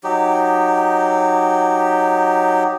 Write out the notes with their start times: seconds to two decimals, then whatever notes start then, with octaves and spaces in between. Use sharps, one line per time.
0.04 F#3 D#4 G4